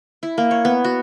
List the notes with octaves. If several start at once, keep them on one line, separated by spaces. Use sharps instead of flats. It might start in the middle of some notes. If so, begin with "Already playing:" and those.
E4
A#3
C#5
B3
F#4